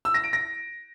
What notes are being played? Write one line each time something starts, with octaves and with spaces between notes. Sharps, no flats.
E6
A#6
D7
A#6